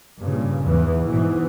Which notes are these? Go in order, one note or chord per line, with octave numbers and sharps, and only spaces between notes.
G2 A#2 C#3
E2 G#2 E3
G#2 B2 E3